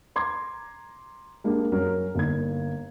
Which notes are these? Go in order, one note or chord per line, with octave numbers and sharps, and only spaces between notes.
A#5 C6 D6 G#6
G#3 A#3 D4 G4
F#2 F#3 A#4
G1 A#3 D#4 G#6